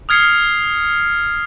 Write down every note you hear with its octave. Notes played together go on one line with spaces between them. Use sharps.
D#6 F6 G#6 C7 C#7